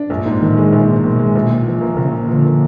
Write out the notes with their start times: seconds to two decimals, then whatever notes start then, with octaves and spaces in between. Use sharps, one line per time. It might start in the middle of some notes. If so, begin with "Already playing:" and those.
Already playing: D4
0.09 A#1 G2
0.26 G#2
0.41 A2 D#3
0.57 G#3
0.72 A#1 A#2
0.88 G#2
1.03 B2 D#3
1.19 G#3
1.35 A#1
1.50 A#2
1.66 F3
1.81 A#3
1.97 A#1 C#3
2.13 A#2
2.29 D3 F3
2.45 A#3